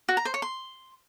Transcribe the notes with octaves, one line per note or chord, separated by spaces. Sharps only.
F#4
A#5
C5
C#5
C6